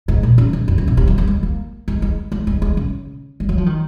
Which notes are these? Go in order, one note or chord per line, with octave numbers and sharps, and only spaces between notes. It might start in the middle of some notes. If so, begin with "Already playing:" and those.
G#2
A#2
C#3
C#3
F2
F#2
A#2
C3
F#3
A#3
G#3
A#3
G#3
G#3
G#3
G#3
G#3
C#3
G#3
F#3
F3
D#3